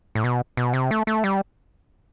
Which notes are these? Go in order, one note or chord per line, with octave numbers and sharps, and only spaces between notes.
A2
B2
B2
C3
A3
A3
G3